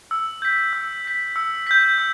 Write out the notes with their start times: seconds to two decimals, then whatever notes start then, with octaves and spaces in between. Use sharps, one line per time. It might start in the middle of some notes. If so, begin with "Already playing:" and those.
0.11 E6
0.42 G6 B6
0.73 E6
1.05 G6 B6
1.36 E6
1.67 G6 B6
1.98 E6